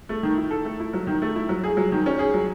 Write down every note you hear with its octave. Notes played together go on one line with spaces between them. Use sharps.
A3
D#3
E4
A4
A3
E4
F#3
D#3
A3
E4
F#3
G#4
F#3
D#3
C#4
G#4
F#3